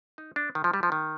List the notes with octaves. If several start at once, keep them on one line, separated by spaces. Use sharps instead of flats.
D#4
D4
D#3
F3
G3
F3
D#3